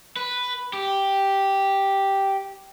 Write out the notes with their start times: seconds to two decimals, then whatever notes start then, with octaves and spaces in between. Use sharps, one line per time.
0.17 B4
0.73 G4